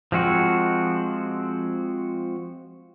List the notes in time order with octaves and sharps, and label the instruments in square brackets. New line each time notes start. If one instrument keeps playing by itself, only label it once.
[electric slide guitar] F3 G#3 C4 F#4